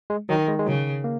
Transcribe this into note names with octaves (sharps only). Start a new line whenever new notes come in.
G#3
D#3 F#3
G#3
G#3
C#3 F#3
A#3